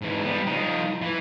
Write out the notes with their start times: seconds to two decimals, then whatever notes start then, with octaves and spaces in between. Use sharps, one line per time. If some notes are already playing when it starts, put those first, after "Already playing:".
0.02 G#2 E3
0.25 G3 B3
0.47 F3 D#4
1.02 E3 E4